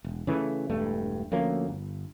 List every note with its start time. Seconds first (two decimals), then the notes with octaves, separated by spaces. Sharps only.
0.04 E1
0.27 C#3 E3 A3
0.69 E1 G2 A3
1.32 D2 F3 A#3 C#4
1.68 G1